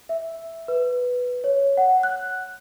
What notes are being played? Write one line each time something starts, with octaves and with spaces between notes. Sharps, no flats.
E5
B4
C#5
F#5
F#6